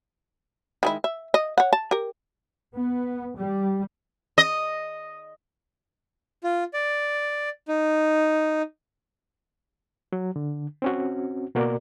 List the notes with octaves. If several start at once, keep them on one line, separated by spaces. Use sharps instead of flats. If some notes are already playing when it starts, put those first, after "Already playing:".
D#3 G#3 E4
E5
D#5
C#5 F#5
A5
G4 A#4
B3
G3
D#5
F4
D5
D#4
F#3
D3
C4 C#4 F#4
B2 A#3 F#4 A#4 D5